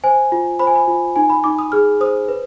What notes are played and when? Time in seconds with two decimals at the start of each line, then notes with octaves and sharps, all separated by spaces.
0.04 C5 G#5
0.32 F4
0.59 C5 B5
0.67 G#5
0.75 B5
0.88 F4
1.16 D#4 G#5
1.30 B5
1.44 D#4 D6
1.59 D#6
1.72 G#4 F6
2.01 C5 D#6
2.28 B4